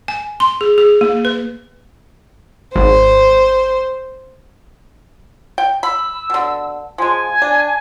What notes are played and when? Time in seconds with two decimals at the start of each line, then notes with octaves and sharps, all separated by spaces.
0.08 G#5
0.40 C6
0.61 G#4
0.78 G#4
1.01 A#3
1.25 B4
2.76 G#1 C5
5.58 G5
5.83 B5 E6
6.30 B2 D3
6.98 F3 G#3 G#5
7.42 D4